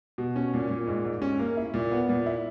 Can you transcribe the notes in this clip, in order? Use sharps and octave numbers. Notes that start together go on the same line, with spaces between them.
B2
C#4
A#2
A#2
G#2
G#2
C#4
A#3
E4
A#2
B3
A#2
E4